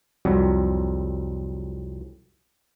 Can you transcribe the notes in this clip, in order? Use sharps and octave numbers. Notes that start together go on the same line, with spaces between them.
C2 F2 F#3 G3